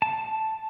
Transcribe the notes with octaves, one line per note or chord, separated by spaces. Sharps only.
A5